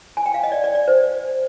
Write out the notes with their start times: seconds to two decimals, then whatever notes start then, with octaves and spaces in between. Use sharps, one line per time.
0.17 G#5
0.26 G5
0.34 F5
0.43 D#5
0.52 D5
0.64 D5
0.75 D5
0.88 C5